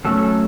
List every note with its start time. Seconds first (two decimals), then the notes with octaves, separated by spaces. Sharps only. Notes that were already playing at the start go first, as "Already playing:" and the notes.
0.05 F#3 A3 C#4 A4
0.23 A4